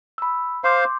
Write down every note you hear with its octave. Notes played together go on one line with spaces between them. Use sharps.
B5 E6
C5 F5 C6 D6 G6